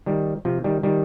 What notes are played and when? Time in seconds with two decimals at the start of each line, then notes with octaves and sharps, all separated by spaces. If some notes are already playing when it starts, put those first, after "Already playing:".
0.06 D#3 G3
0.45 C3 F3
0.64 D#3 G3
0.83 D#3 G3